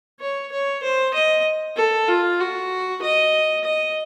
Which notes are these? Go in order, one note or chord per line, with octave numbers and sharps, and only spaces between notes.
C#5
C#5
C5
D#5
A4
F4
F#4
D#5
D#5